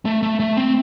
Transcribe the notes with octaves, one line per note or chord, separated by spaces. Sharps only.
A3
A3
A3
C4